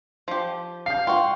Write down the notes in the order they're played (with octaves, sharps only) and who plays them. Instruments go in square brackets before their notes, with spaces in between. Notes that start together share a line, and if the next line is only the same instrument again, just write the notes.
[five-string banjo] F3 G4
[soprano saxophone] F5 [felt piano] G6 C7
[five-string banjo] F4 F#4 [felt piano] G5 C#6